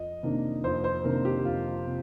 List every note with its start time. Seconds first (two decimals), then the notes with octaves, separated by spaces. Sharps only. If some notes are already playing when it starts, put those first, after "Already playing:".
Already playing: F2 D#5
0.23 C3 D#3 A#3 D4
0.64 F2 C5
0.84 C5
1.04 C3 D#3 A#3 D4 A#4
1.25 G4
1.45 F2 F4
1.86 C3